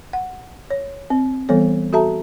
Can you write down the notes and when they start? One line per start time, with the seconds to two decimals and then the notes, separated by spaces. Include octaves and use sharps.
0.13 F#5
0.70 C#5
1.10 C4
1.49 E3 G3 B3 A4 C#5
1.93 F#4 A4 E5 A5 A#5